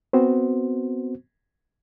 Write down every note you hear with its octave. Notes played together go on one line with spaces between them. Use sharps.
B3 C4 F#4 C5